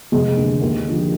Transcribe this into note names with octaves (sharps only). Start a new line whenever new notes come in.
F1 G#3
D#2 D3
D#2
D3 F3